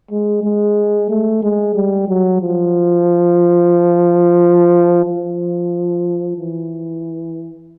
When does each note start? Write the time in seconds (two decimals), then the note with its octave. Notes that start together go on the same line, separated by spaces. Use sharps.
0.11 G#3
0.43 G#3
1.10 A3
1.43 G#3
1.75 G3
2.08 F#3
2.42 F3
5.05 F3
6.36 E3